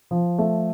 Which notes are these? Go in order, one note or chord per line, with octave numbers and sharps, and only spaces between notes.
F3
A3